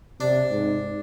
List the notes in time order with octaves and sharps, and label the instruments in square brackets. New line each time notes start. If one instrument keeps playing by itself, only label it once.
[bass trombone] C3 [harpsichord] D4
[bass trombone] G#2